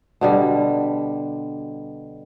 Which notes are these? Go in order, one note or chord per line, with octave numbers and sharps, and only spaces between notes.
B2 D3 G3